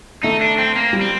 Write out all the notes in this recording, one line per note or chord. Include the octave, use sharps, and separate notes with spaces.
A3 D#4
D4
C4
A#3
G3
C4